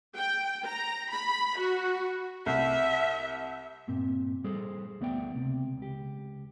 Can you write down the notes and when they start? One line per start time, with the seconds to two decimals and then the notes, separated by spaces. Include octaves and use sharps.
0.15 G5
0.66 A#5
1.11 B5
1.58 F#4
2.46 C2 E5
3.87 G2 A#2 C4
4.44 G3 G#4 A4 C5
5.00 D2 A3 B3 D5 E5 G5
5.34 C#2 C3
5.78 C#2 G4